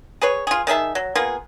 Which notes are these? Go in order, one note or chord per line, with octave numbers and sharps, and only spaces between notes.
G#4 B4 C#5
F4 G#4
D#3 G#4 E5 A5
F#3
A#3 B3 F4 G#4